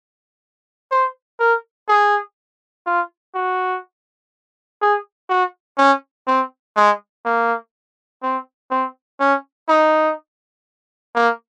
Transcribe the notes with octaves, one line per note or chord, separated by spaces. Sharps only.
C5
A#4
G#4
F4
F#4
G#4
F#4
C#4
C4
G#3
A#3
C4
C4
C#4
D#4
A#3